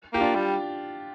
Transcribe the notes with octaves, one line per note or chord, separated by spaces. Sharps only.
A#3 G4
D4 F4
G3